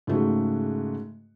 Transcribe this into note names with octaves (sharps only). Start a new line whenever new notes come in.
G#2 C#3 A3 F#4